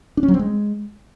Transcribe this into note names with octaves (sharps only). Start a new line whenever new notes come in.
D4
C#4
F#3
C4
G#3